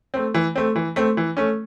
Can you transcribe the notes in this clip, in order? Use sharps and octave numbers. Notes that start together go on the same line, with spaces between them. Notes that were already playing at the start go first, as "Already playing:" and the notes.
A3 C4
E3
A3 C4
E3
A3 C4
E3
A3 C#4